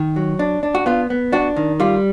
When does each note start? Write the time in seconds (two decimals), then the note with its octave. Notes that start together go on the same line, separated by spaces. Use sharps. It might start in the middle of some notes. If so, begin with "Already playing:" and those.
Already playing: D#3
0.16 F#3
0.39 D4
0.63 D4
0.75 F#4
0.86 B3 F4
1.10 B3
1.32 D4 F#4
1.56 D#3
1.80 G3 F4